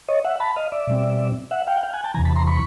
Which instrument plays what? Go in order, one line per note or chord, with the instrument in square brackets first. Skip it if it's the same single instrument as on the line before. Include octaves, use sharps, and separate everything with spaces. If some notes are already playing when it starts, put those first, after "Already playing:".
[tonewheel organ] C#5 D#5
E5 F#5
A5 B5
D#5 F5
D5 E5
B2 G3 C4
E5 F#5
F5 G5
F#5
F5 G5
F#5 G#5
G5 A5
E2 C3 E3 G#5 A#5
A5 B5
A#5 C6
B5 C#6